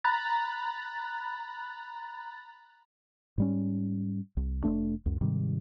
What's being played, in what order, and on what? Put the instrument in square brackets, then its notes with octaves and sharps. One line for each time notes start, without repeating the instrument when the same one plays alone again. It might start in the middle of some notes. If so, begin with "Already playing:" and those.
[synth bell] A#5 B5 F#6 A6
[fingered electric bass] G#2 G3 C#4
C2
F1 A2 A3 D4
C#2 F#2
G#2 C3 D#3 G3